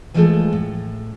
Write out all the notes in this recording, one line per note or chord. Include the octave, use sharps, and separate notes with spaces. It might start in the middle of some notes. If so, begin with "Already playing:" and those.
E3 F3 G#3 A3 G#4 A4
A2